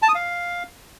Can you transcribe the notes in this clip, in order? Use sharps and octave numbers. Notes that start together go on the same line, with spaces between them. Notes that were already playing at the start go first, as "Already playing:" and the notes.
A5
D#6
F5